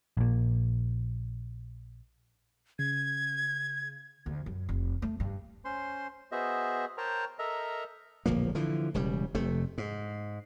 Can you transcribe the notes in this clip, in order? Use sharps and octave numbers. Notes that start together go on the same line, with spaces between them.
A#1 A#2
C#3 G#6
D2
F#2
F1
A3
G2
C#4 C5 C6
B3 F#4 G#4 C5 D#5 E5
A#4 C5 C#5 G5 A5 A#5
A4 A#4 D#5 E5 A#5
D1 A#1 F3 A#3
D3 E3 F3
E1 C#3 G3
F1 C3 A3
G#2